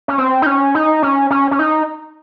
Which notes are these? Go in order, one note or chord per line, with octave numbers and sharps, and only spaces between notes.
C#4
C4
D#4
C#4
D#4
C#4
C#4
C#4
D#4